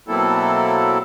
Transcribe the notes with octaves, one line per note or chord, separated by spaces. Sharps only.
B2 F#3 A#3 C4 E4 A4